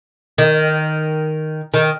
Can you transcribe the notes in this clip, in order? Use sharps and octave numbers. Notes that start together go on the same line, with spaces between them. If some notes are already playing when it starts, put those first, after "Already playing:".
D#3
D#3